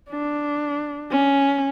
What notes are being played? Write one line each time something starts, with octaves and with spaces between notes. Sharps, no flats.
D4
C#4